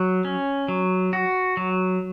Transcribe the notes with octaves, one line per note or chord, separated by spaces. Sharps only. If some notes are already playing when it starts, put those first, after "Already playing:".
Already playing: F#3
C#4
F#3
F#4
F#3